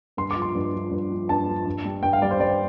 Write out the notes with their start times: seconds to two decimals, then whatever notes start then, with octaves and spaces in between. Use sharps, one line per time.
0.17 G2 C6
0.31 D6
0.36 F3
0.42 C6
0.55 G2
0.74 F3
0.91 G2
1.11 F3
1.29 G2 A5
1.48 F3
1.66 G2
1.85 G3
2.03 G2 G5
2.13 F5
2.22 G3 D5
2.31 C5
2.40 G2 D5